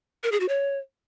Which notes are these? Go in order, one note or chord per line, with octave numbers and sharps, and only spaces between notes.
A#4
G#4
F#4
C#5